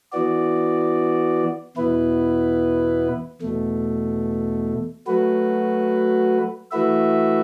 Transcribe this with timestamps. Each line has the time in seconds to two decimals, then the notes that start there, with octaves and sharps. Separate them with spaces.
0.12 E3 B3 F#4 D5
1.77 E2 B2 B3 E4 B4
3.42 E2 B2 A3
5.07 F#3 A3 F#4 B4
6.71 E3 A3 F#4 B4 E5